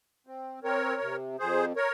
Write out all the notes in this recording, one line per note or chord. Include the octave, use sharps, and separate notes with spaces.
C4
C4 A#4 C#5
C3
F2 G#4 C5
A#4 C#5